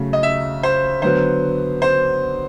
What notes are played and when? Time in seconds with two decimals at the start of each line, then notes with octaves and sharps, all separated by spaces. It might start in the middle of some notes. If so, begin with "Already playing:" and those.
Already playing: C#3 F#3 A3
0.13 D#5
0.23 E5
0.63 C5
1.02 D3 F#3 B3 C5
1.82 C5